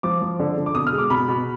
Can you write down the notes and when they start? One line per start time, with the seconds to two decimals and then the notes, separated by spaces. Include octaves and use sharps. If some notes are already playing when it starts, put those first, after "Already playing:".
0.03 F3 D6
0.22 F3
0.40 D3
0.57 D3
0.66 D6
0.75 B2 D#6
0.87 F6
0.93 G#3
0.98 D6
1.10 B2 B5
1.28 B2